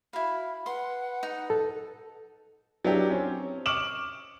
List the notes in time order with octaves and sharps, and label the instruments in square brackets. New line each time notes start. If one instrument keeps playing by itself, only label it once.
[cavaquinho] E4 F5 [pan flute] F#4 [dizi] B5
[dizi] B4 [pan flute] F#5 [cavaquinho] C6
[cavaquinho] D#4
[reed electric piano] A4
[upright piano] F#3 B3 D4 E4 G4
C4 C#4
C#6 D6 F6 D7 E7 F#7